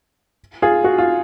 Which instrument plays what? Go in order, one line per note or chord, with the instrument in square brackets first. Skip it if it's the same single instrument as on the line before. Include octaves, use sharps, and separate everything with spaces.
[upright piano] F4 G#4
F#4
F4